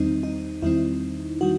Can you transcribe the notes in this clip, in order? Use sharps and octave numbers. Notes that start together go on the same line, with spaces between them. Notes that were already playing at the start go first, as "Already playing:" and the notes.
Already playing: E2 D#3 G3 C4 D#4
D#4
E2 D#3 G3 C4 E4
D#3 G3 F#4